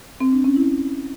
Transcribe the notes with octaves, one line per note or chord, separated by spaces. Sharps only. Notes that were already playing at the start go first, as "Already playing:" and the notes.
C4
D4
C#4
E4